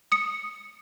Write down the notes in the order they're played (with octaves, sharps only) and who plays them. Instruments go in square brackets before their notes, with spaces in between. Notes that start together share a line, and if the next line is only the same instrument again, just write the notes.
[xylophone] D#6 C#7